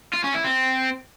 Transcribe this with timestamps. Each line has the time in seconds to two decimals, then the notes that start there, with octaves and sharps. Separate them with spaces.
0.14 F4
0.24 C#4
0.34 E4
0.45 C4